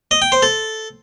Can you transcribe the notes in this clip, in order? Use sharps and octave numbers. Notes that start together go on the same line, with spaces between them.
D#5
G5
C5
A4